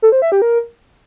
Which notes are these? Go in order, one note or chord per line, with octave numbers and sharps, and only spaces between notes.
A4
C5
E5
G4
A#4